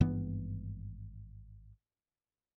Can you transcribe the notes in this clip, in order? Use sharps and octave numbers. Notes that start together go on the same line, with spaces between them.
G#1 G2 E3 B3